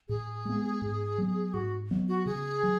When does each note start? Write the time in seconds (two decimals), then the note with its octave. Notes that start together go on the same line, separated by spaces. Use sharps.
0.09 A2 G#4
0.45 G#3 B3
0.82 G#2
1.18 F#3 B3
1.54 G#2 F#4
1.91 F#3 B3
2.08 F#4
2.26 C#3 G#4
2.63 F#3